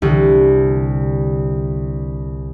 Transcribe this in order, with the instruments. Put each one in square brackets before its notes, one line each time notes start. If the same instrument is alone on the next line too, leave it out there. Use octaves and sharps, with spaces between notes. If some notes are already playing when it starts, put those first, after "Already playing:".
[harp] C2 D3